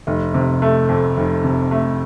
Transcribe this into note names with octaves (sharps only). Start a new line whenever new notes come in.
F1
C3
A3
F2
F1
C3
A3